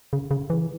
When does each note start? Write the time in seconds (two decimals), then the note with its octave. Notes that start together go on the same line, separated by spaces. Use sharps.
0.13 C#3
0.31 C#3
0.50 E3